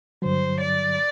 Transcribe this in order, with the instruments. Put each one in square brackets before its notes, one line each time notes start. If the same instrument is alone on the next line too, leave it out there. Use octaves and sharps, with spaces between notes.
[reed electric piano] G2 D3 F#3 [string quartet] C5
[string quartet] D5